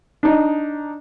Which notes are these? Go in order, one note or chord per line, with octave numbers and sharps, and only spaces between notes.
D4 D#4